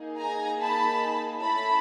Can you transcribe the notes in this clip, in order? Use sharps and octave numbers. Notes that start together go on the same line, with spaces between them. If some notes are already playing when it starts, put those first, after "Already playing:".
Already playing: A#3 D#4 G#4
G#5 A#5
A5 B5
A3 C#4 E4 A5 B5